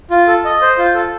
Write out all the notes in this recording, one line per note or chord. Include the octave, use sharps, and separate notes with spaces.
F4
A4
D#5
C5
F4
A4